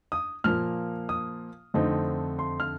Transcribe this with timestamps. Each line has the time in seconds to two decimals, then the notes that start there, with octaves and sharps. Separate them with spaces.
0.12 D#6
0.44 A#2 F3 A#3 F6
1.09 D#6
1.74 F2 D3 A3 C4 D#4
2.39 C6
2.60 F6